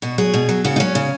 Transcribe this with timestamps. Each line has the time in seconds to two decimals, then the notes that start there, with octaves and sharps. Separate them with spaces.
0.02 B2 F#4
0.18 F#3 G#4
0.34 B2
0.49 F#3
0.64 C#3 F#4
0.76 D#4
0.80 F#3 C#4
0.95 C#3